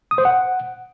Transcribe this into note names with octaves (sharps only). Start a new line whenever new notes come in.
D#6
C5
F#5